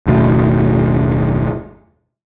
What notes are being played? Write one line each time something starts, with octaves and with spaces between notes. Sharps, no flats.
F#1 D#2 B2 A3